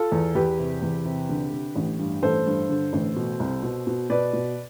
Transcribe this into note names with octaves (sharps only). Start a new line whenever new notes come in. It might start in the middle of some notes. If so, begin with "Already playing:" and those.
Already playing: F4 A4
E2
E2 G4 B4
C3
E2
C3
D3
D3
A1
G2
A1 A4 C5
G2
D3
A1
B2
C2
B2
B2
B2 B4 D5
B2